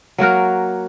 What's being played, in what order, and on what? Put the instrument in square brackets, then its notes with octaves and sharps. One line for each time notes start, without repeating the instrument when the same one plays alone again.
[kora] F#3 A#3 F#4 A#4